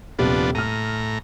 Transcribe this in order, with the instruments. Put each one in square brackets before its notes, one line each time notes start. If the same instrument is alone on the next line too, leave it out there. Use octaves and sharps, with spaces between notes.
[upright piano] D#1 C3 [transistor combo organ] F3 B3 D4
[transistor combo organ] A2 A#5 [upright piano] F6 D#7